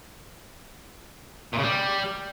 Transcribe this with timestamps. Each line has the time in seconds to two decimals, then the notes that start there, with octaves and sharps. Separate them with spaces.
1.53 A#2
1.58 C#3
1.63 G3